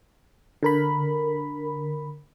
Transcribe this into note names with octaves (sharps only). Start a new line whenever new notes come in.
D3 A#4 B5